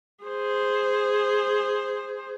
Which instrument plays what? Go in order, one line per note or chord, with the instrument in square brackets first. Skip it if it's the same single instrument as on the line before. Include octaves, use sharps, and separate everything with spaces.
[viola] G#4 C5